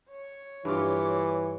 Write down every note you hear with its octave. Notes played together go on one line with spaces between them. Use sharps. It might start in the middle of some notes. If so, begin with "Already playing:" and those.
C#5
G2 E3 F4 D6